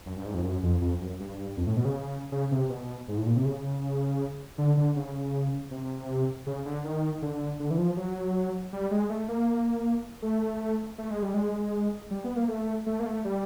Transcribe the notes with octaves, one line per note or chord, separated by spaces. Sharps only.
F#2
G2
G#2
F2
F#2
F2
F2
F#2
G2
F2
A2
B2
C#3
C#3
C3
B2
G#2
A2
A#2
C3
C#3
D3
D3
C#3
C3
C#3
D3
D#3
D3
D3
E3
F3
F#3
G3
G#3
A3
A#3
A3
A3
G#3
G3
G#3
G3
B3
A#3
A3
A3
A#3
A3
G3